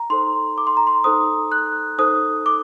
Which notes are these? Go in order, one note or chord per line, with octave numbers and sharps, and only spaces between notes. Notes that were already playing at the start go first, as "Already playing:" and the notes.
Already playing: A#5
D#4 A4 C5 C6
D6
C6
A#5
C6
D#4 A4 C5 D#6
F#6
D#4 A4 C5 D#6
D6